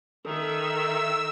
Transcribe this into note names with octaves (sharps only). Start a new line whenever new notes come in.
D#3 A4 E5 E6